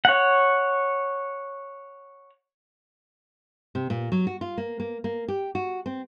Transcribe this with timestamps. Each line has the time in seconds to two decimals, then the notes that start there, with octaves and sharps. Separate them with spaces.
0.05 C#5 F#5
3.75 C3
3.90 A#2
4.12 F#3
4.27 F#4
4.41 F4
4.58 A#3
4.80 A#3
5.04 A#3
5.28 G4
5.55 F#4
5.86 C4